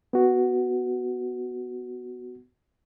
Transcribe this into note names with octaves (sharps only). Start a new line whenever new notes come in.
B3 F#4